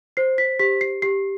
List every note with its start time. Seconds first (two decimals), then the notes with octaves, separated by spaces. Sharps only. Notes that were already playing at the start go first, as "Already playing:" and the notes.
0.17 C5 C7
0.38 B6
0.59 G4 B6
0.81 C7
1.02 G4 C7